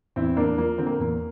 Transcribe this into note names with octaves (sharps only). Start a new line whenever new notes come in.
E2 C4 E4
E2 A#3 D4
F3 A#3
D3 C4
A#3
E2 A#3